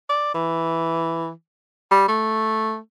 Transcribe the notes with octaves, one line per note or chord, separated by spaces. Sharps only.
D5
E3
G3
A3